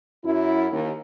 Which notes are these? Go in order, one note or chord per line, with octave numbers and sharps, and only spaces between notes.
F#2 E4
D#2